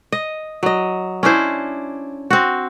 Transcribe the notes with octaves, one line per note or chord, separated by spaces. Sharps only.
D#5
F#3 D#5
C#4 D4 E4 C5
C4 F#4